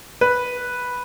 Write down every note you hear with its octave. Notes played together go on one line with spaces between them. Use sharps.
B4